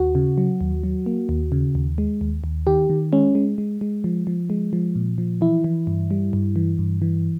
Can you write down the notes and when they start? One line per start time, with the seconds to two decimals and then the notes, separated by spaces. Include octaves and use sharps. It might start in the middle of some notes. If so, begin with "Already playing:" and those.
Already playing: D#2 F#4
0.15 C#3
0.38 F#3
0.61 D#2
0.83 F#3
1.06 A#3
1.29 D#2
1.52 C#3
1.75 D#2
1.98 G#3
2.21 D#2
2.44 D#2
2.67 D#3 G4
2.90 D#3
3.13 G#3 C#4
3.35 G#3
3.58 G#3
3.81 G#3
4.04 F3
4.27 F3
4.50 G#3
4.73 F3
4.96 A#2
5.18 F3
5.41 E3 E4
5.64 E3
5.87 G2
6.11 G3
6.33 G2
6.56 E3
6.79 G2
7.02 E3